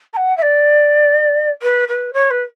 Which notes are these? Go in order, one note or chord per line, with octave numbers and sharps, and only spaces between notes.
A#5
F#5
E5
D5
B4
B4
C#5
B4